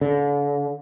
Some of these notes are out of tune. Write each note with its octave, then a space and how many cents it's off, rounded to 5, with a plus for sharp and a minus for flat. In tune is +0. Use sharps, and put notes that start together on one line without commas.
D3 -40